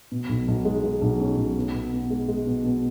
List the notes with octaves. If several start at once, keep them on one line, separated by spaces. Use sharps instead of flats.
B2
B1
B1
G#3
G#3
B1
C#4
B1
B3
B2
B3
G#3
G#3
B2
B2